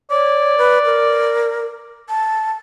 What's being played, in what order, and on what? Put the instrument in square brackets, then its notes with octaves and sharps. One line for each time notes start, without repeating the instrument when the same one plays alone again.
[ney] C#5 [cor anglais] D5
[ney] B4
A#4
A5